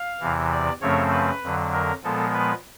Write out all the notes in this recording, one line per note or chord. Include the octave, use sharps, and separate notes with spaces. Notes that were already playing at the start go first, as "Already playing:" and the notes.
Already playing: F5
E2 C3 E3
D5
F#2 C#3 F3 A3 C4 C#5
B4
F2 D3 F#3
A#4
A#2 F3 G#3 B3 A4
B4